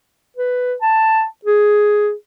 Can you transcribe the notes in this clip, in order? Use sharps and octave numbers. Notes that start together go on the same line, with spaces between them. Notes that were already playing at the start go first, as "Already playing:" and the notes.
B4
A5
G#4